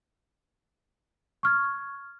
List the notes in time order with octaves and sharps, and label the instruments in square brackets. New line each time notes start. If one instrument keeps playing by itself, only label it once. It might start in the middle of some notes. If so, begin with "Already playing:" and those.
[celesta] C#6 F6 G#6